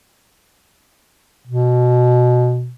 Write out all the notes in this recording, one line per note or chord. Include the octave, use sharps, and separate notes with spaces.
B2